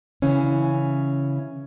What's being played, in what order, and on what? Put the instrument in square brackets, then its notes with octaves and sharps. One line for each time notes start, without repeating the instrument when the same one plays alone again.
[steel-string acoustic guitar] C#3 E3 C#4